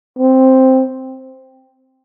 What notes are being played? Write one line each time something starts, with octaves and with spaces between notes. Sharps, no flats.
C4